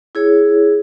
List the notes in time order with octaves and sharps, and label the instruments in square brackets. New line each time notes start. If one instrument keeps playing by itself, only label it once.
[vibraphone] E4 G#4 C#5